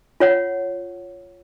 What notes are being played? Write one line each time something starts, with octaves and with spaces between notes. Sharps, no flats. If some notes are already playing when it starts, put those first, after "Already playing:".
F4 C#5 F#5